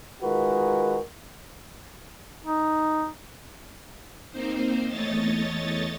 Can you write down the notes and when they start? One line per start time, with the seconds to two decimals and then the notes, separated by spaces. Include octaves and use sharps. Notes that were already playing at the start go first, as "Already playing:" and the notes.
0.22 D#3 G#3 F4 F#4 A#4 B4
2.45 D#4
4.31 A#3 C4 D#4 C5
4.88 E2 A3 C#5 D#5 A6